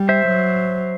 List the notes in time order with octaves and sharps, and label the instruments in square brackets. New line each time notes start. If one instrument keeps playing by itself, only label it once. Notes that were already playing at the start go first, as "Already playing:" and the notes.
Already playing: [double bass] G3
[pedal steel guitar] C5 E5
[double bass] F#3